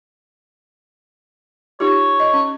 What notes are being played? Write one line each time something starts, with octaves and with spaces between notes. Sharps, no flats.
D#4 F4 G4 C#5
D#5
C#4